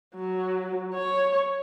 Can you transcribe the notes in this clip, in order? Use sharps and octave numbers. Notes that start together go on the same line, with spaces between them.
F#3
C#5